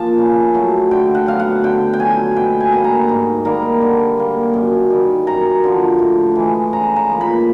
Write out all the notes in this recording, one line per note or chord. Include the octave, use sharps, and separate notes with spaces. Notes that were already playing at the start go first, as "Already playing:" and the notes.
Already playing: F3 A#3 A5
C#3
F#3 A3
D3 G5
F#5
F#3 B3 F5
F#5
D3 G5
G5
F#3 A3 G#5
B2 G5
G#5
G3 A#3
A#5
G#2
D#3 G3 A#3 A#5
D3
G3 A#3
F#2
D#3 G3
F#2 A#5
D3 F3
A2
E3 G#3
C#3 A#5
A#5
F3 A#3
B5